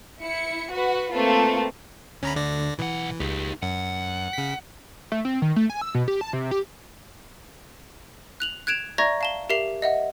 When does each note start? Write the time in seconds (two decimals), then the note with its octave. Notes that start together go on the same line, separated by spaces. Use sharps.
0.23 E4 C#7
0.70 F#4 B4 F#5
1.12 A3 A#3 C4 F4 A4 B4
2.23 D2 C#4 A#5 B5
2.36 D3 D5 A#6
2.79 B1 E3 F#5
3.20 C#2 D#4 G4
3.63 F#2 F#5
4.33 C#3 B6
5.12 A3
5.25 C4
5.42 D#3
5.56 A3
5.70 G#5
5.82 E6
5.95 B2
6.08 G4
6.21 A5
6.33 C3
6.51 G4
8.40 F#6 F7 F#7
8.67 F#6 G#6 D7 E7 F7
8.98 D5 E5 A#5 C#6 G#6 A#6
9.21 F5 A5 G7
9.50 G4 A#4 E5 C7 F7
9.82 D#5 E5 F#5